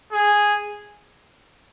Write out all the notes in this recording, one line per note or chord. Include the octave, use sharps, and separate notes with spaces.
G#4